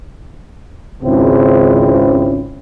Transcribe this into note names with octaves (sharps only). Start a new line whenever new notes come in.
G#1 C#2 G#2 C#3 C4 E4